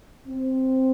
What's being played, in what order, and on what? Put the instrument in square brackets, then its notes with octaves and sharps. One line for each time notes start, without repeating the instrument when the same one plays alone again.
[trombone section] C4